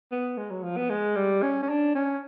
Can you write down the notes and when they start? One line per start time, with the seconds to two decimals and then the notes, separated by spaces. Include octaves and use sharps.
0.12 B3
0.37 G#3
0.51 F#3
0.63 F3
0.77 B3
0.90 G#3
1.16 G3
1.43 C#4
1.63 C#4
1.69 D4
1.95 C#4